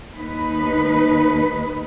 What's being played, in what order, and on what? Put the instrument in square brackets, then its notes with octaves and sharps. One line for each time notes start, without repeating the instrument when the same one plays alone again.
[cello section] D#2 D#4 B4